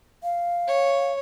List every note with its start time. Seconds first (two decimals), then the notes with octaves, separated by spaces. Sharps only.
0.23 F5
0.67 C#5